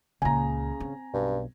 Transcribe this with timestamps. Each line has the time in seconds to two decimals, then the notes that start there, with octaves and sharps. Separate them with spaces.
0.22 C#2 A#2 C#3 G#5 A#5
0.80 C4
1.14 B1 G2